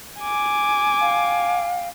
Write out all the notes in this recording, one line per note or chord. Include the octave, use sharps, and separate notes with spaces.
G#5 D6
F5 G5